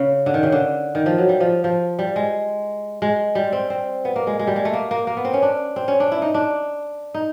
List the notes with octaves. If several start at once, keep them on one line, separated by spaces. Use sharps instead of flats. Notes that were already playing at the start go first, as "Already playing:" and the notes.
Already playing: C#3
D3
D#3
C#3
D3
D#3
F3
F#3
G3
F3
F3
G3
G#3
G#3
G3
C4
C4
B3
A#3
G#3
G#3
G3
G#3
A3
A#3
A#3
A#3
B3
C4
C#4
D4
C4
C#4
D4
E4
D#4
D4
D#4